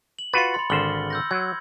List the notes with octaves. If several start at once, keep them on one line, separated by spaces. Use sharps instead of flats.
F#7
F4 F#4 B4 A6 C#7
B5 C6
G#1 D3 C5 F6 F#7 G7
E6 G6 A#6
F#3 G#6